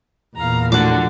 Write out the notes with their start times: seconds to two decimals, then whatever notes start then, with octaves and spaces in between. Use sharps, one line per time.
0.36 E2 A#2 F5 A#5
0.72 A2 D3 F3 F#4 F#5 D6